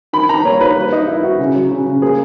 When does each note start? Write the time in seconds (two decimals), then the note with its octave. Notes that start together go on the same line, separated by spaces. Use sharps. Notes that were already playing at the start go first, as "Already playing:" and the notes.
0.13 D#3 B5
0.29 D#3 A#5
0.45 A#3 C#5
0.61 D#3 B4
0.76 A#3 B4
0.92 D#3 D#4
1.08 D#3 E4
1.24 D#3 F#4
1.39 C#3
1.55 F#3
1.71 C#3
1.86 C#3
2.02 A#3 G#4